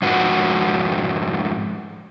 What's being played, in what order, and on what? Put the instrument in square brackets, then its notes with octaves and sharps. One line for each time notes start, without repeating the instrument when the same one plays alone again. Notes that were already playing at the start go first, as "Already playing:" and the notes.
[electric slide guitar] F2 G#2 F#4